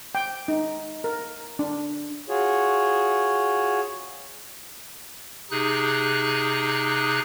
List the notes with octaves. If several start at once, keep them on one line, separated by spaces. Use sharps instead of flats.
G5
D#4
A#4
D4
F4 F#4 G#4 C#5
C3 D#4 G#4 F#6